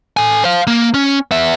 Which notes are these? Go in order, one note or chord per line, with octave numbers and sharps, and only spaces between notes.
A4 G#5
C5 F5
A#3
C#4
B3 E5